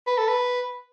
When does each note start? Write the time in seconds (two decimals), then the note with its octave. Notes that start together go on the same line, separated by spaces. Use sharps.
0.07 B4
0.18 A4
0.28 B4